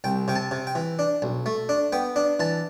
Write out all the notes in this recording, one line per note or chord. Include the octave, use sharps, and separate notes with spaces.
C2 G5
C3 G5
A5
C3
G5
E3
D4
B1
A3
D4
B3 G5
D4
E3 A5